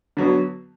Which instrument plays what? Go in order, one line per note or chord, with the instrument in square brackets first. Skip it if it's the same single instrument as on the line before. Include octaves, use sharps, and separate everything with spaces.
[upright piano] D3 F#3 B3